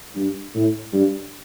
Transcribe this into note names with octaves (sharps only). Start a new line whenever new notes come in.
G2
A2
G2